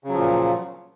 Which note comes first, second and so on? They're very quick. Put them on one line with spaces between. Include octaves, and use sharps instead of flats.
C#3 F#3 F3 A#2